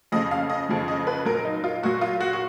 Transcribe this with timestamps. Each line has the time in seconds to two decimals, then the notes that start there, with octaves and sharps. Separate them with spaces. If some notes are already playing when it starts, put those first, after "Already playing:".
0.12 F2 C#3 F3 D#5
0.31 F5
0.50 D#5
0.69 F2 C#3 F3
0.88 D#5
1.07 B4
1.26 A#2 F#3 A#4
1.45 D#4
1.64 F4
1.83 A#2 F#3 F#4
2.01 F4
2.21 F#4
2.33 F#4